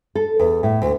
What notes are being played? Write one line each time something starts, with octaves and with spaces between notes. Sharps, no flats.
A4
E2
A2
D2